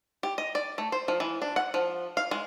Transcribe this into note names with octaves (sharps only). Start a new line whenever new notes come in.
G4
D#5
D5
A3
C5
F3
E3
D4
F#5
F3
F5
G#3